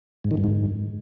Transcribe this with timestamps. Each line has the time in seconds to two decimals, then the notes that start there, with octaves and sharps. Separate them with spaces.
0.24 G#2
0.31 D#3
0.37 G2
0.44 G#2